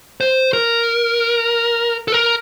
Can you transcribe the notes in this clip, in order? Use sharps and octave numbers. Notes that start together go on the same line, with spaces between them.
C5
A#4
A4
A#4